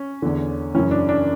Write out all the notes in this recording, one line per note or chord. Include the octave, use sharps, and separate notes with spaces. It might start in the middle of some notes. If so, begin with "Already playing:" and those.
Already playing: C#4
E2 D3
F#2 C#3 E3 C#4
D4
D4